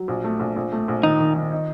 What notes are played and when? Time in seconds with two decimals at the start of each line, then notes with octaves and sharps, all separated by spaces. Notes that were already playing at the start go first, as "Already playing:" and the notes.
Already playing: F#3
0.08 A#1
0.24 A3
0.40 A#1
0.56 A#1
0.72 A3
0.88 A#1
1.03 D#3 D#4
1.20 D#3
1.36 D#3
1.52 D#4